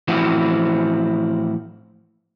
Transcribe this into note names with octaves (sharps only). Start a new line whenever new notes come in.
A2 E3 F3 C4 E4 F#4